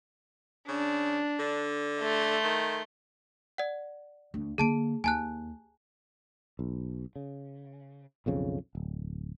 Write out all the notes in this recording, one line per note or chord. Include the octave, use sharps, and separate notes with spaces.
C#3 D4
D3
A3 C6
D#3
D5 F#5
D2
D3 A#3 G#4 A5 D7
D#2 G#5 A5 F#6
B1
C#3
B1 F2 C#3
D1